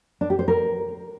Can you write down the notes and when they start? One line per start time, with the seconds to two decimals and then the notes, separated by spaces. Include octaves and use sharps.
0.21 D4
0.30 G4
0.39 C5
0.48 A#4